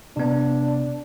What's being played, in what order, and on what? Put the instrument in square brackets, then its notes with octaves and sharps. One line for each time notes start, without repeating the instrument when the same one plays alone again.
[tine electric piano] C3 B3 [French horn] D4